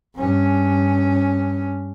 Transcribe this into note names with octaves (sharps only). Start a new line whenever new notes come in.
G2 C#4